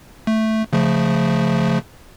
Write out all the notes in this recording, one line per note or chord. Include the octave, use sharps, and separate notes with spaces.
A3
C#3 F3 A3